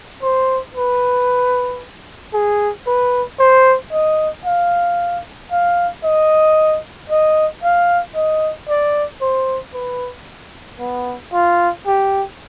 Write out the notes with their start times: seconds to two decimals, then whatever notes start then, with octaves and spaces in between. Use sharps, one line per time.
0.22 C5
0.75 B4
2.34 G#4
2.87 B4
3.40 C5
3.92 D#5
4.45 F5
5.51 F5
6.04 D#5
7.10 D#5
7.63 F5
8.15 D#5
8.69 D5
9.22 C5
9.74 B4
10.80 B3
11.33 F4
11.86 G4